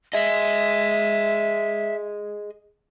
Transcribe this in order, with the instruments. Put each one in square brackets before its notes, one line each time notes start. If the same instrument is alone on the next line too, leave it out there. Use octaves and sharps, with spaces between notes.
[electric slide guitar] G#4 D#5 [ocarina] E5